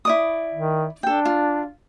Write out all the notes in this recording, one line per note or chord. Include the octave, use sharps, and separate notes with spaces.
E4 D5 D#6
D#3
D4 A4 G5
F4